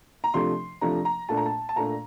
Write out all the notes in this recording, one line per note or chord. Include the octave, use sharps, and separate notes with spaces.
A#5
C3 F3 A3 D4 C6
C3 F3 A3 D4 A#5
A#5
A#2 A3 D4 A5
A#5
A5
A5
A#2 A3 D4 A#5